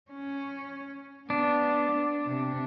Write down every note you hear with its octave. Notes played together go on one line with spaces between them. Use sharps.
C#4
B3 D4
C3